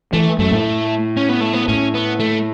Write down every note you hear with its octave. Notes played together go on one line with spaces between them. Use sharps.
E3 A3
F#2 A3
A2
C#4
B3
A3
B3
A2 C#4
B3
A3